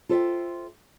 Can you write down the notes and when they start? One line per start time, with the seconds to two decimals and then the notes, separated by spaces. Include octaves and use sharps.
0.09 F4 A4 C5 C#5 E5 G5